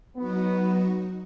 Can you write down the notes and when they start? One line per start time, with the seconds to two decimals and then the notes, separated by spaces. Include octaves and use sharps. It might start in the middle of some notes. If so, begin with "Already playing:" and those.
0.17 F#3 B3 D#4 F#4